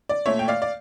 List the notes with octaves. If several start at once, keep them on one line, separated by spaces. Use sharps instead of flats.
D5
A#2 A3 C#5 E5
G5
D5 F5
D5